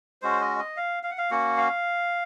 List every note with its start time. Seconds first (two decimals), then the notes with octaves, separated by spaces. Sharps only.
0.22 G#3 C#4 F#4 C5
0.41 D#5
0.59 D#5
0.77 F5
1.03 F5
1.11 F#5
1.18 F5
1.30 A#3 C#4 F#4 F#5
1.57 F5